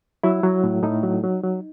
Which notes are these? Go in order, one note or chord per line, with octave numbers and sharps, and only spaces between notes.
F#3 E4
F#3
A2
A2 D#4
F#3
F#3
F#3